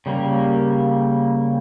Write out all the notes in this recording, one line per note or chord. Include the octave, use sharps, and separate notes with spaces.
C#3 G3 A#3